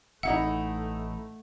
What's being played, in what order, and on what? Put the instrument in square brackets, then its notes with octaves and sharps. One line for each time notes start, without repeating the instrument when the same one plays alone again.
[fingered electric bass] A1 [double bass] A3 [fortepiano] D#4 E4 E5 [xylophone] F#5